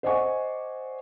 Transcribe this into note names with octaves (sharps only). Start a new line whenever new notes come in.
C5 D5 D#5 F#5 G#5 C#6